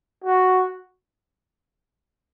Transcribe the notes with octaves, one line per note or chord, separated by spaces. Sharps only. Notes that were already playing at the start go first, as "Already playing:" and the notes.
F#4